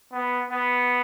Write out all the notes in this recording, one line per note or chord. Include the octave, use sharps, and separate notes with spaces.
B3
B3